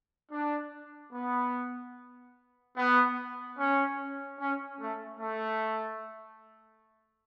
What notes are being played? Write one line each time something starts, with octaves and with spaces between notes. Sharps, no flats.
D4
B3
B3
C#4
C#4
A3
A3